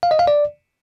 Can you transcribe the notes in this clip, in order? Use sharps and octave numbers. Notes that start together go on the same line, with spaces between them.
F5
D#5
F5
D5